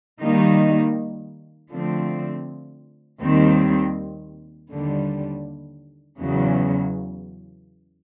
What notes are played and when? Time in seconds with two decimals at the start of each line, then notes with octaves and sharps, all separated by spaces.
0.22 D#3 G3 A#3 D#4
1.72 D3 F3 A3 C4
3.21 D#2 D#3 G3 C4
4.71 D#2 D3 G3
6.21 E2 C#3 F#3